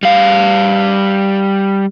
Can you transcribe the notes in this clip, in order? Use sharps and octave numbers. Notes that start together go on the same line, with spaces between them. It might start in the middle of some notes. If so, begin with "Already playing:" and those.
G3 F5